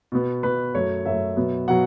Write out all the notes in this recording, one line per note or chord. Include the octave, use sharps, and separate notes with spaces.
B2 B3
B2 B3 B4
F#2 F#3 A3 C#5
F#2 F#3 A3 E5
B2 F#3 B3
B2 F#3 F#5